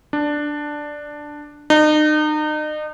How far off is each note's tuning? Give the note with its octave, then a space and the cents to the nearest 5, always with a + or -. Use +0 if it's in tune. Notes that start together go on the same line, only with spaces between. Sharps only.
D4 +5
D#4 -35